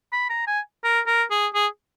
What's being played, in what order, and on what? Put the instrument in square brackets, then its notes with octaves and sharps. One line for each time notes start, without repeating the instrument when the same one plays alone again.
[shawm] B5
A#5
G#5
A#4
A#4
G#4
G#4